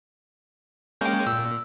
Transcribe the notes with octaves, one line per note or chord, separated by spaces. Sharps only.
G#3 A#3 C#4 G5 G6
A#2 E6